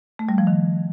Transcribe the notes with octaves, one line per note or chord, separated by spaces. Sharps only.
A3
G3
F3
D#3